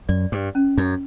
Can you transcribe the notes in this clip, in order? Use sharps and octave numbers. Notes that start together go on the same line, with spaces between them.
F#2 D5
G2
C#4
F#2